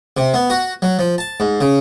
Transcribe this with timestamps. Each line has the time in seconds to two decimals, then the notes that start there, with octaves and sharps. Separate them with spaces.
0.17 C3
0.34 B3
0.50 F#4
0.82 F#3
0.99 F3
1.18 A5
1.40 G#2
1.61 C#3